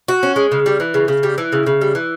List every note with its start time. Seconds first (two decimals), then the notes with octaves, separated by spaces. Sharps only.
0.08 F#4
0.23 C#4
0.36 G#3
0.52 C#3
0.66 G3
0.80 E3
0.94 C#3
1.08 C#3
1.23 G3
1.38 E3
1.52 C#3
1.66 C#3
1.81 G3
1.95 E3